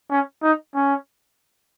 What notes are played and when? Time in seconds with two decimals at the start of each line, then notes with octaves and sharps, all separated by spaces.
0.11 C#4
0.43 D#4
0.75 C#4